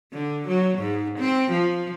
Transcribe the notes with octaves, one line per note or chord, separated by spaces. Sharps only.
D3
F#3
G#2
C4
F3